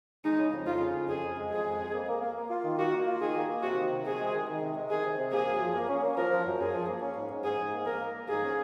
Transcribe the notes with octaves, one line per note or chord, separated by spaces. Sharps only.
G#3 D#4
C#3
F2
F2 F4
C#3
F2
F2 G#4
F2
G#3
F2 G#4
G#3
F2
A#3
A#3
A#3
A#3
F4
D#3
A#3 F#4
A#3
F4
D#3 G#4
A#3
A#3
C3 F#4
D#3
C3
C3 G#4
G#3
D#3
D#3
C3
G#3
D#3 G#4
C3
C3
A#3 G#4
F#2
F3
A#3
C#4
A#3
F3 A#4
F3
F#2
F#2 G#4
F3
A#3
C#4
G#2
G#2
G#2 G#4
G#2
A#3
A#3 A#4
A#3
A#3
G#2 G#4
C#4